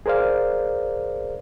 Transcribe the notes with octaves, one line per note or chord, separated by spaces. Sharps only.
G#4 A#4 C5 D5 F5